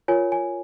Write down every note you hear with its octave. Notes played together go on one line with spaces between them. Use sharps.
F4 A#4 C#5 G#5
G#5